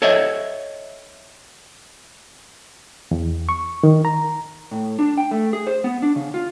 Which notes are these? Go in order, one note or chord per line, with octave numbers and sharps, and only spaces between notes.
A4 C#5 D#5 E5
E2
C#6
D#3
A#5
A2
D4
G5
A3
G#4
C5
B3
D4
C#3
F4